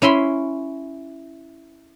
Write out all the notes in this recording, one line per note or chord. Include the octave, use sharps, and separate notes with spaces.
C#4 E4 B5 C6